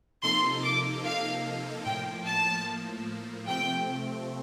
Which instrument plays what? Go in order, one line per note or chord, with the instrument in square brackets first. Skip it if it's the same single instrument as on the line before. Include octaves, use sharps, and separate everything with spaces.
[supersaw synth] C3 F3 A#3 D#4 A4 [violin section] C6
[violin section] D6
F5
[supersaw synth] A2 F3 A#3 [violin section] G5
[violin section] A5
[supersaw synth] C3 F3 A3 C4 [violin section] G5